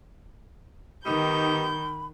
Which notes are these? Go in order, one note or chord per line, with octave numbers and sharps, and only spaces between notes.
D#3 G3 B3 D#4 B5 G6